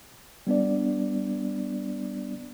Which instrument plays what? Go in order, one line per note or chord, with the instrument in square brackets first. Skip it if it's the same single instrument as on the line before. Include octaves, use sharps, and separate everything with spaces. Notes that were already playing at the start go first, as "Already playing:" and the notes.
[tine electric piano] G3 B3 D4 D5